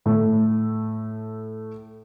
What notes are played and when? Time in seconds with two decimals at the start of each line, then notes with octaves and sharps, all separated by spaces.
0.06 A2 A3